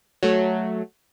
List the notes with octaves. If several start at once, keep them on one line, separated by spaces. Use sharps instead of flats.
F#3 A3